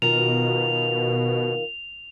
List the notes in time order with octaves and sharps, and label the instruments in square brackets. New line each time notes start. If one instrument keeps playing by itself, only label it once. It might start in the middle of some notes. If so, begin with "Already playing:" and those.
[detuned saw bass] B2 [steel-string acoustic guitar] D#3 F4 A#4 [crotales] F7